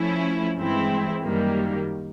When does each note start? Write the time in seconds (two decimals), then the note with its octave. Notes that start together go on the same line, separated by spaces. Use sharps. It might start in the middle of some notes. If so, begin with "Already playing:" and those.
Already playing: F3 A3 C#4 E4
0.56 G2 E3 G#3 C4 E4
1.22 F#2 D#3 G3 A#3